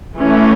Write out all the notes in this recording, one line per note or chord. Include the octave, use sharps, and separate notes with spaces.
E3 A3 C#4